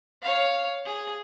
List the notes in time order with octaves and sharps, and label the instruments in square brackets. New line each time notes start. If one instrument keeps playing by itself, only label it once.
[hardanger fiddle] C#5 F5
G#4